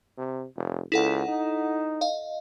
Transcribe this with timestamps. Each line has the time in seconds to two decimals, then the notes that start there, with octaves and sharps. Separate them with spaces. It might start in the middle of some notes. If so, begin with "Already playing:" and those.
0.18 C3
0.56 F1
0.92 C#2 E4 A4 F#5
1.29 D#4
2.01 D#5 F5